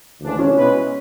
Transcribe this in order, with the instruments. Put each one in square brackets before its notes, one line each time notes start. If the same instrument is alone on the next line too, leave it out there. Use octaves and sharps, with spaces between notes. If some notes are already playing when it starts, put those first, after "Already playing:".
[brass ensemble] D2 C#3 E3 G#3 D4
[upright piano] C#4
[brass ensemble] B2 G#3 B3 E4 B4